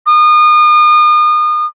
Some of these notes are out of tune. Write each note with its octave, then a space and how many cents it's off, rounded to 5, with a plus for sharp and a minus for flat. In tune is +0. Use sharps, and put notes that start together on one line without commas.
D#6 -35